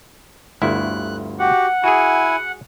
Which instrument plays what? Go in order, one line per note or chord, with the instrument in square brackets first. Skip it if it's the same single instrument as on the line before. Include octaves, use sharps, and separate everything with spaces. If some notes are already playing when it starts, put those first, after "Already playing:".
[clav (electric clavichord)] G1 D2 E4 [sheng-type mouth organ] F#6
[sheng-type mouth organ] F#4 G4 [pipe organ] F#5
[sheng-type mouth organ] E4 G#5 [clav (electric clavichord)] F#4 G#4